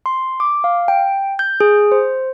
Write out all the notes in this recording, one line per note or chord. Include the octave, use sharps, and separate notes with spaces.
C6
D6
F5
G5
G6
G#4
C5